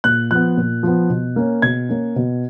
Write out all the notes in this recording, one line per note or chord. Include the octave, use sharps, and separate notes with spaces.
A#2 F#6
F3 B3 F#6
A#2
F3 B3
B2
A#3 C#4
B2 G#6
A#3 C#4
B2